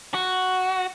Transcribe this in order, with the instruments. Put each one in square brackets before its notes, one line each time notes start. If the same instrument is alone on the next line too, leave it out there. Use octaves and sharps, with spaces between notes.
[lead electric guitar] F#4